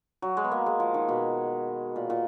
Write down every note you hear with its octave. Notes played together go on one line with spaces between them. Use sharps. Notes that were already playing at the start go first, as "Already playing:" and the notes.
F#3
G#3
B3
A#3
G#3
F3
D#3
B2
A#2
A#2